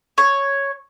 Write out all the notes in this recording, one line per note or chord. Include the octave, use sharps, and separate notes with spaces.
C#5